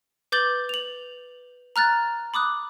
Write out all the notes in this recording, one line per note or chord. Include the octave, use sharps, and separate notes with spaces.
B4 D6 G6 A6 F#7 G7
F7 F#7
A#5 F6 F#6 A6
B5 D6 D#6 F#6